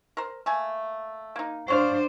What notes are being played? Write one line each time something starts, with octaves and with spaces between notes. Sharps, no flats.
A#4 C5
A3 A#3 G#5
A#3 D#4
D4 F#4 C5 C#5 F5